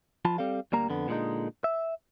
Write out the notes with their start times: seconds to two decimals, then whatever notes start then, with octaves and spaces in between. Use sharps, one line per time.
0.25 F3 F4 A5 B5
0.38 G3 C4 A4 F5
0.72 D2 G3 A#3 A#5
0.89 F2 D3 B3
1.08 A#2 D3 G#3 B3 D#4
1.64 E5